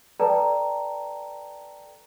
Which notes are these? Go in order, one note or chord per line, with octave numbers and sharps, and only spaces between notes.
A4 B4 D5 G5 A5 A#5